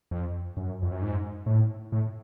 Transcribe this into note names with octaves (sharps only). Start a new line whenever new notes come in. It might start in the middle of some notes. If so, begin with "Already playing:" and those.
F2
F#2
F2
F#2
G#2
A2
A2